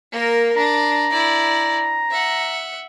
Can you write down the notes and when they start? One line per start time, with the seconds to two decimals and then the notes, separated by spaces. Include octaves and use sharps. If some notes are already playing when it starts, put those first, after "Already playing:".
0.12 A#3 A#4
0.57 D4 A#5
1.10 E4 D5
2.11 E5 F#5